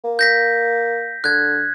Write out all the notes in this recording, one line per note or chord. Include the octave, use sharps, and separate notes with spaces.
A#3
G6 A#6 B6
D3 F#6 G#6